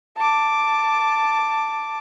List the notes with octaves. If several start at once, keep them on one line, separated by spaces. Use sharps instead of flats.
A5 D6